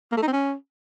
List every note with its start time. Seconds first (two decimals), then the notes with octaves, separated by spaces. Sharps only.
0.12 A#3
0.17 A3
0.22 D#4
0.27 C4
0.33 C#4